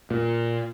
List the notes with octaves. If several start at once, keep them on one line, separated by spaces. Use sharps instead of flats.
A#2